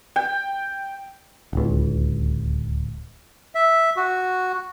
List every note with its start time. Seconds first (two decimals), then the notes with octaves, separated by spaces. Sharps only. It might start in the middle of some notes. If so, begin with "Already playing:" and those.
0.16 G5
1.53 D1 C#2
3.55 E5
3.96 F#4